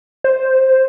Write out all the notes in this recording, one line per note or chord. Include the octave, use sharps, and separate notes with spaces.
C5